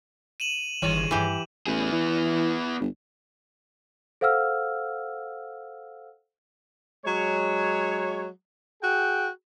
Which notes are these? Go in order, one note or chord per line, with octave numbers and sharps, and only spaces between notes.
D#7 E7 F#7
G1 D#3 G#3 C#5 D#7
G2 E3 E4 G4
A1 B3 G#4
E3
G1
A4 C5 F5 F#5 E6 F6
F#3 G#3 C#5
F#4 G#4 G5